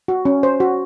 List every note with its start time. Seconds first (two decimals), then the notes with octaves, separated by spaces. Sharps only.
0.08 F#4
0.25 C#4
0.43 C5
0.60 F#4